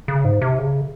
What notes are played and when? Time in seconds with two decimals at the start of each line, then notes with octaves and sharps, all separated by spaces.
0.08 C#3
0.25 G#2
0.42 C3
0.59 C#3